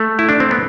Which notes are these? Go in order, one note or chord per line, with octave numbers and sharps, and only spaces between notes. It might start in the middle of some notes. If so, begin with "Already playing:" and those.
Already playing: A3
E4
D4
C4
B3